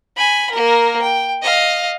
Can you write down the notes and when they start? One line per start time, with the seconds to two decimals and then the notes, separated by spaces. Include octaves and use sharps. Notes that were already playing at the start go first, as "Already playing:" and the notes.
0.17 G#5 B5
0.51 A#3 A#4
1.01 G5
1.43 D#5 F5